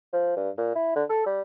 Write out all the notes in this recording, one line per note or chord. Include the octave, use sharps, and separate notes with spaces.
F3
G2
A#2
E4
D3
A4
G3